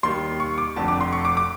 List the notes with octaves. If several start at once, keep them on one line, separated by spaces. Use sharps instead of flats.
D#2 D#3 G3 C6
C#6
D6
F1 F2 D3 A5
D6
C6
C#6
D6
D6